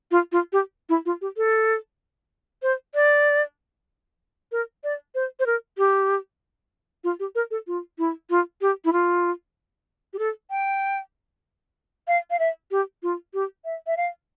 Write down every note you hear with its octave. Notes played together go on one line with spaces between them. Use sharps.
F4
F4
G4
E4
F4
G4
A4
C5
D5
A#4
D5
C5
C5
A#4
G4
F4
G4
A#4
A4
F4
E4
F4
G4
E4
F4
G4
A4
G5
F5
F5
E5
G4
F4
G4
E5
E5
F5